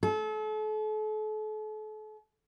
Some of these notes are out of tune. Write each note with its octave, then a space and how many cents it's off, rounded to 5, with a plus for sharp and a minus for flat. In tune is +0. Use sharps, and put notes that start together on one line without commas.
A4 -40